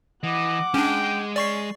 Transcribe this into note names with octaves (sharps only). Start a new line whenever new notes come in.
E3 D#5 F#5 D6
G#3 C#4 D4 G5
C#4 D5 C#6 C7